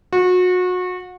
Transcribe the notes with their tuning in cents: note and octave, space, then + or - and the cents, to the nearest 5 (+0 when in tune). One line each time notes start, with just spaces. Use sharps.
F#4 -30